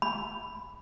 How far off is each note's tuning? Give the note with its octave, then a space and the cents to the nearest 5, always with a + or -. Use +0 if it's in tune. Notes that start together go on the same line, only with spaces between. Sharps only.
B5 +5